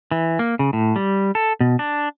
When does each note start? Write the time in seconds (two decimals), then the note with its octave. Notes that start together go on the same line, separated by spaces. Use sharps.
0.11 E3
0.39 A#3
0.59 C#3
0.73 A2
0.96 G3
1.35 A4
1.60 B2
1.79 D4